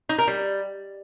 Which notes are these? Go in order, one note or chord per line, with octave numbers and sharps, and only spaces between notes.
D#4
A#4
G3